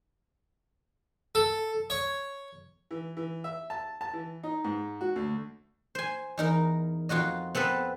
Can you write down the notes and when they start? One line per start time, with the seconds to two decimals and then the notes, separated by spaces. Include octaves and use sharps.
1.35 A4
1.90 C#5
2.91 E3
3.17 E3
3.44 E5
3.70 A5
4.01 A5
4.13 E3
4.43 D#4
4.64 G#2
5.01 F#4
5.16 D2
5.95 C5 G#5
6.38 E2 D#4 A#4
7.09 F2 F4 F#4 D#5
7.55 B3 C4 A4 B4